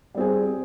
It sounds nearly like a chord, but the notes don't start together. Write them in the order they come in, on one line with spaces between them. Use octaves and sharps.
G3 C4 G#4